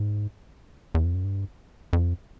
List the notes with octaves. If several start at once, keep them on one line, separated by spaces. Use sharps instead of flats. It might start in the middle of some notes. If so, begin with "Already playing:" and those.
Already playing: G#2
E2
F2
F#2
G2
F2